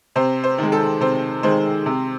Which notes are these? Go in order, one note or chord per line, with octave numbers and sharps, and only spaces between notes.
C3 C5
C5
D#3 G#3
A4
C3 C5
D#3 G#3 C5
C3